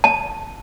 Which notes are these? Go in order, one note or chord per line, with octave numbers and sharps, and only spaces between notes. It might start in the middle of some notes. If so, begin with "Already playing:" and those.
A5